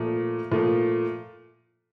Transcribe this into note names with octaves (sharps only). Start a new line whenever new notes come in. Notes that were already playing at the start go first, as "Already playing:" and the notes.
Already playing: A#2 F3 A3
A#2 F3 A3